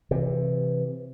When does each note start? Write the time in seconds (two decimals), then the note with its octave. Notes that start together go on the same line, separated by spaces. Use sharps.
0.11 C3 E3